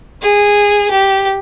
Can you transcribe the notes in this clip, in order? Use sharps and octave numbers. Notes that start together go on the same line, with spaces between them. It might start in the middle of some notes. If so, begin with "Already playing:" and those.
G#4
G4